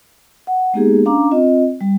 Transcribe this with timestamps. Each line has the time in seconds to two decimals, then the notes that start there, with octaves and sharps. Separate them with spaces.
0.47 F#5
0.73 G#3 A#3 B3 D#4 G4 G#4
1.05 C#4 D4 F5 A#5 D6
1.31 C4 F4 D#5
1.81 G3